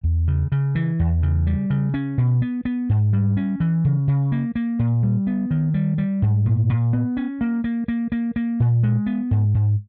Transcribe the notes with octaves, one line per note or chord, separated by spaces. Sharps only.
E2
C#3
C#3
E3
E2
C#3
G3
C#3
C#4
B2
B3
B3
G#2
G3
C#4
E3
C#3
C#3
A#3
A#3
A#2
G3
B3
D#3
G3
G3
G#2
A#2
A#2
B3
C#4
A#3
A#3
A#3
A#3
A#3
A#2
G#3
B3
G#2
G#2